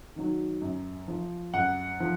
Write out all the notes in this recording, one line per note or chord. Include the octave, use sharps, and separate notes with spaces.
D#3 F#3
F#2
F3
F#2 F#5
F3